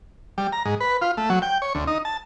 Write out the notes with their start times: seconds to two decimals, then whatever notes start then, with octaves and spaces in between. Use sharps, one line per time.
0.38 G3
0.53 A#5
0.65 G#2
0.80 B4
1.01 F4
1.17 A3
1.30 F#3
1.42 G5
1.62 C#5
1.75 D2
1.87 D#4
2.05 A5